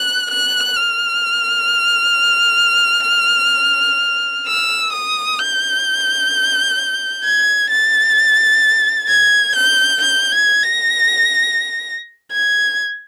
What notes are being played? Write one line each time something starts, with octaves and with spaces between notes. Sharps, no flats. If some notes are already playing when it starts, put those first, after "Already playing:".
Already playing: F#6
F#6
F6
E6
D#6
G6
G#6
A6
G#6
G6
G6
G#6
A#6
G#6